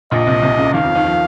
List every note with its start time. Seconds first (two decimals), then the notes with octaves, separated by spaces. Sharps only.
0.11 A#1 A#2 D#5
0.27 C2 C3
0.42 C2 C3
0.58 C#2 C#3
0.74 D#2 D#3 F5
0.84 F2 F3
0.95 D#2 D#3
1.05 F3